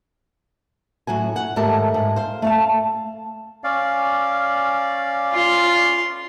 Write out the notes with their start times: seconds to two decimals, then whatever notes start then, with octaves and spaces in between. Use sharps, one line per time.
1.07 A2 F#3 F#4 G#5
1.36 F#5
1.56 D#2 G#2 A3 G4 A#4 A5
1.94 G#2
2.16 C5 F5
2.42 A3 F5 A5
3.64 C#4 D5 F5
5.34 F4 C6